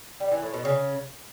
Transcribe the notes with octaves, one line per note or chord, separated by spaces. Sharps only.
G3
E3
A2
B2
C#3